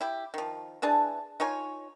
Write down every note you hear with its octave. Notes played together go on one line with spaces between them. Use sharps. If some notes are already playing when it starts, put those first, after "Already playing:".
E4 G4
D#3 F3
E3 D4 G#4 A5
D#4 F4 C#5 G#5